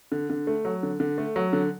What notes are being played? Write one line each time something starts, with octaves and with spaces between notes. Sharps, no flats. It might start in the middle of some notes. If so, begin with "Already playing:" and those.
D3
D3
A3
F#3
D3
D3
A3
F#3
D3